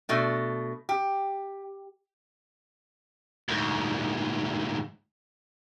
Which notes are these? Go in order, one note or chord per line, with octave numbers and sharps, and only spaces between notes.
B2 A3 D4
G4
D2 G#2